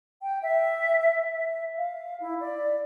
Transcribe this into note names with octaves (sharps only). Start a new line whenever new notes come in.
G5
E5
E5
F5
E4
D5